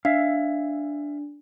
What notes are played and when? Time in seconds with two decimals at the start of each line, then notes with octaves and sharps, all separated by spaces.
0.05 D4 E5 F5